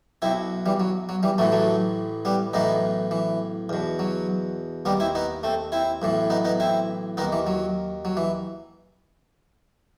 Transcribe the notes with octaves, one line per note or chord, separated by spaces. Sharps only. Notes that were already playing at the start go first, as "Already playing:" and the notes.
B1 B2 C4 E4
E3 G3
F#3
F#3
E3 G3
A1 A2 E3 F#3 A3
F#3 A3
G3 B3
B1 A2 E3 B3 D#4
E3
E2 B2
F#3
D#2 D#3 G3 B3
C4 E4
B3 D#4
A3 C4
C4 E4
B1 A2 E3
B3 D#4
B3 D#4
C4 E4
D#2 D#3 B3 D#4
E3
F#3
F#3
E3